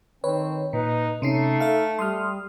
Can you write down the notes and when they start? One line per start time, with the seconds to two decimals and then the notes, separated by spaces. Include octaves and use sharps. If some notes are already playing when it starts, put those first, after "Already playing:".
0.24 D#3 C4 B4 C#5
0.73 A#2 D#4 B4
1.22 C3 A3 C#4 D#4 C7
1.60 A4 E5 F5
1.99 G3 C6 D#6 F6